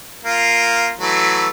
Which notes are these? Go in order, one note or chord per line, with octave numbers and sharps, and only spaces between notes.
A#3 F4
E3 F#3 A3